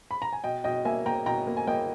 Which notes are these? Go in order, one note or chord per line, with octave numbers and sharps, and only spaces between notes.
B5
A#5
G#5
B2 D#5 G5
B2 D#5 G5
A#3 E5 G#5
A#3 G5 A#5
B2 G5 A#5
A#3
G#5
A#3 D#5 G5